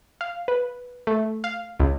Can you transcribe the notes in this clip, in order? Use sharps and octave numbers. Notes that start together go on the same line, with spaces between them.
F5
B4
A3
F5
C#2